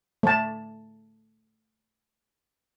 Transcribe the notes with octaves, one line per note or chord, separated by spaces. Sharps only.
A3 A5